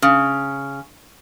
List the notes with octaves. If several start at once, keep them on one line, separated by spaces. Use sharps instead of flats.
C#3